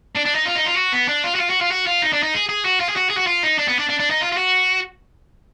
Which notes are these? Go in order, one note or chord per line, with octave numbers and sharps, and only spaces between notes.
D4
D4
D#4
F4
D#4
F4
F#4
B3
D4
F4
F#4
F4
F#4
F4
F#4
F4
D#4
D4
D#4
G#4
G#4
F#4
F4
G#4
F#4
G#4
F#4
F4
D#4
D4
B3
D4
D4
D4
D#4
F4
F4
F#4